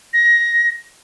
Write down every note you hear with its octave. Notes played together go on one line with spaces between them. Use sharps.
A#6